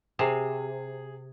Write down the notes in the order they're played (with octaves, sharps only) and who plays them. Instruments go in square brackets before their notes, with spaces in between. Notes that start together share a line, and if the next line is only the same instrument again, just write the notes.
[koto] C3 [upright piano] G#4